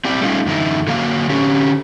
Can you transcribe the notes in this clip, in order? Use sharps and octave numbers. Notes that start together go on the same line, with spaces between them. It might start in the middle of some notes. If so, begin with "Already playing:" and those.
C4 E4 G4 D5
G3 A3 C#4 D#4 F4
F#2 D3 E3 D#4 E4
D3 F#3 A#3 F5
D3 C#4 G4